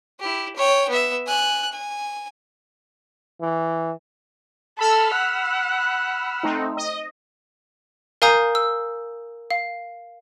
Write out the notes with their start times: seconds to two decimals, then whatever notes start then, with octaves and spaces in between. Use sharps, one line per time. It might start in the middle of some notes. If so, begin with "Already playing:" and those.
0.20 E4 G4
0.56 C#5 G5
0.89 B3 E5
1.27 G#5 F#6
1.72 G#5
3.41 E3
4.79 A4 B5 E6 F6
5.16 F#5
6.43 A3 C4 D#4
6.77 D#5
8.22 A#4 F5 G#5 A#5 D#6 G6
8.55 E6
9.51 F5